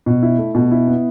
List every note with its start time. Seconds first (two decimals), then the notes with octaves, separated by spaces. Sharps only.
0.06 B2
0.22 E4
0.38 A3
0.55 B2
0.71 E4
0.88 B3